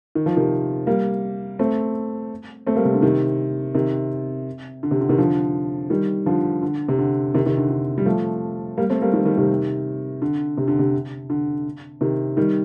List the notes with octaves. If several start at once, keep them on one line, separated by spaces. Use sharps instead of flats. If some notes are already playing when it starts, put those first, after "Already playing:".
D#3
F3
C3 D#3
G3 A#3
A3 C4
A3 C4
G3 A#3
C3
D3
C3 D#3
C3 D#3
D3
C3
D3
C3 D#3
D3 F3
D#3 G3
D3 F3
D3
C3
D3
C3 D#3
C3 D#3
D3
D3
G3
F3 A3
G3 A#3
A3 C4
G3 A#3
D#3 G3
D#3 G3
C3 D#3
D3
C3
D3
C3
D3
C3 D#3
D#3 G3